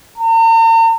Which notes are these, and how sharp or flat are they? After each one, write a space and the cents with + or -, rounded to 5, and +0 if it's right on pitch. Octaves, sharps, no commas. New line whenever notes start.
A#5 -45